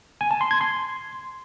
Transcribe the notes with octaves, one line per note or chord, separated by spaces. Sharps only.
G#5
A5
C6
G#6
C6